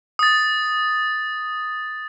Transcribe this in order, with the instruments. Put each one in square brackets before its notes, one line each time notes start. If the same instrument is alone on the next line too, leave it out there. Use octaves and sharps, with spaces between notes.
[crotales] D#6 A6